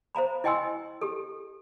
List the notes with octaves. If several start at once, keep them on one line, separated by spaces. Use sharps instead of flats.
C5 F5 A#5 B5
E4 D#5 G5 G#5 C6 E6
G4 A4